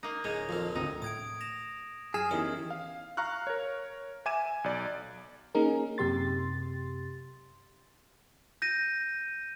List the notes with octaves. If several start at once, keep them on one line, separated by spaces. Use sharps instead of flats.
A#3 D#4
D1 C#3 G#3 C#5 D#5
F2 A#2 F3 A#3
G#1 D2 C3 C4 D#4
A2 D#6 G#6 D7
A#6 E7 F7
F#2 G#4 F6 G#6 C7 E7
E2 D#3 C#4 E4 G4 D#6
F5
F5 A#5 C#6 F6 F#6
A#4 C#5
E5 G#5 D6 G#6 D#7 E7
B1 D5
A#3 C#4 D#4 G#4 A#4
F#2 C3 G4 C6 A6
G6 A#6 D#7